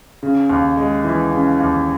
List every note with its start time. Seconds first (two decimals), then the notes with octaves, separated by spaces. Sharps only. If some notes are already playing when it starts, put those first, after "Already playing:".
0.23 C#3
0.50 D#2
0.77 G#3
1.04 E3
1.32 C#3
1.61 D#2